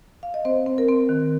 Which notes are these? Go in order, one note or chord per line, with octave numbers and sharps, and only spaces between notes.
F5
D#5
C4 C5
C4
A#4
C4
D#3